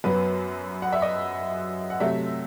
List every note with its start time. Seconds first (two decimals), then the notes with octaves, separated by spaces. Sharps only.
0.04 F#2 F#3 B3 B4
0.82 F#5
0.92 E5
1.02 D#5
1.90 F#5
2.00 C3 F#3 A3 E5